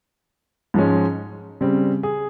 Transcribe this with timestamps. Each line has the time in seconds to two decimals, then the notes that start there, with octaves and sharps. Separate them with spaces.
0.74 G#2 F3 G#3 C#4
1.61 C#3 G3 C4
2.03 G#4